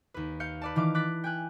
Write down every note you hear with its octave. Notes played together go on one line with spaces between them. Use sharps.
D#2 B4
F5 G6 C#7
B4 D5 A5
D#3 E3 F5 D6
D6 F#6 A6 B6
G5 G#5 F#6